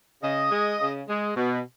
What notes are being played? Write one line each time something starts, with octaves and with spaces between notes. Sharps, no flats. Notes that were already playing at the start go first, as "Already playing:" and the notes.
C#3 D#5
G#3
C#3
G#3
B2